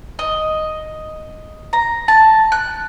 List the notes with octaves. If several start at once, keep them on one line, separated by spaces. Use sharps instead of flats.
D#5
A#5
A5
F#6